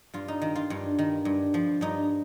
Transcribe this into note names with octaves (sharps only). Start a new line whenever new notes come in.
G2 F4
D#4
D#3
F4
G2
D#3
G2
F3
G2 D#4